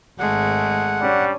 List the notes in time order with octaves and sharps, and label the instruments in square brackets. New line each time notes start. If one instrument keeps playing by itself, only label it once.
[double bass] G#1 [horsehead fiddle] G#3 A3 [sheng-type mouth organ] F#5
[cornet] G3 [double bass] C#4 D4